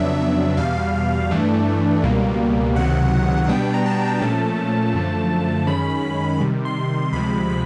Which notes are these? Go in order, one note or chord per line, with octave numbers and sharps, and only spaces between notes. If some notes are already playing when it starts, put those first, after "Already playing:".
Already playing: F2 C#3 F#3 B3 D4 E5
E5
E2 B2 G3 F5
G2 E3 A3 D4
C#2 B2 G3 A#3
C#2 C3 D#3 F#3 F#5
B2 G3 B3 D4 G5
A#5
A5
A#2 F3 A3 C#4 A5
F#2 D3 F3 A3
F#2 D#3 G#3 C#4 B5
C3 D#3 G3
C6
D2 C3 F3 G#3 B5
B5